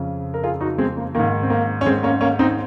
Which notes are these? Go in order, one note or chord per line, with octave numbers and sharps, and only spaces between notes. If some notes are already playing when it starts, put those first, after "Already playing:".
Already playing: F2 C#3
A#4
F4 G#4
D#4 F#4
G#3 C4
A#3
G#2 D#3 A#3
C4
A#3
C#4
G#3 C4
A#3 C#4
A#3 C#4
C4 D#4